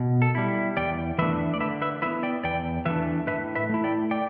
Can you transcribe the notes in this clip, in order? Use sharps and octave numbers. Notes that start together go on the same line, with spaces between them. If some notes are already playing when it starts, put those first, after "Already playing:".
Already playing: B2
A4
G3 E4
E2 D5 G5
E3 A3 D4 B4 E5
D5
D3 B4 E5
B4 E5
B3 E4 B4 E5
D5 G5
E2 D5 G5
E3 A3 D4 B4 E5
A2 B4 E5
B4 E5
A3 E4
D5 G5
D5 G5